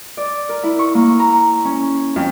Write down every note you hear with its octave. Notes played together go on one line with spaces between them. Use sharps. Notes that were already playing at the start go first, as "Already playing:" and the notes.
D5
A#4
E4
C#6
A#3
A#5
C#4
F2